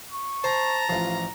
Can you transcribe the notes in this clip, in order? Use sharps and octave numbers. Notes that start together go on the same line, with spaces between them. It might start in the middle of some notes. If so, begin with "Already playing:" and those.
C#6
C5 A5 A#5
A1 F3 F4